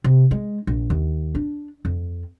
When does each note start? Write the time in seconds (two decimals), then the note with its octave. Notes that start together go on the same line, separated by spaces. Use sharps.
0.04 C3
0.31 G#3
0.67 A#1
0.90 D#2
1.35 D4
1.85 F2